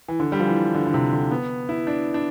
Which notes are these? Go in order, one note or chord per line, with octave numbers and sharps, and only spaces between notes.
E3
D3
G3
F3
E3
D3
D3
C3
D3
B3
E4
D4
D4